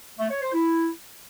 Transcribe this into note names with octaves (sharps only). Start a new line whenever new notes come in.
A3
C#5
C5
E4